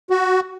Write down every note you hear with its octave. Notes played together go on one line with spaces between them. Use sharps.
F#4